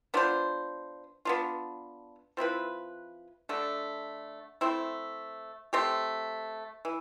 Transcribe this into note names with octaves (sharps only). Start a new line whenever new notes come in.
B3 D4 F4 C5
B3 D4 F4
F3 C4 E4 B4
D3 A3 D4
A3 C4 E4
A3 C4 G4
E3